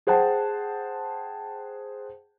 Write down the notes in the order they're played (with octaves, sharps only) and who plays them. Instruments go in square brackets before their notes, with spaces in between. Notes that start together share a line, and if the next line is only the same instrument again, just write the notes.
[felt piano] G#4 C5 F#5 G5 A5